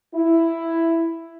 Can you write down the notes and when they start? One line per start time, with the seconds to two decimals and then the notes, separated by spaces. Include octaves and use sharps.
0.15 E4